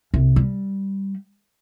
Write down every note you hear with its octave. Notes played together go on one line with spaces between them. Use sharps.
C2
G3